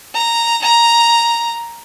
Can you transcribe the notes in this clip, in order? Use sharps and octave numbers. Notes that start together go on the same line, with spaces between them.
A#5
A#5